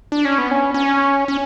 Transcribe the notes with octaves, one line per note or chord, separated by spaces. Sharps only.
D4
C#4
B3
C#4
C#4
C#4